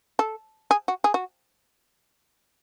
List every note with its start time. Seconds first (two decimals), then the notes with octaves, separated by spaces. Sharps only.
0.19 A4
0.71 G#4
0.88 F#4
1.04 G#4
1.14 F#4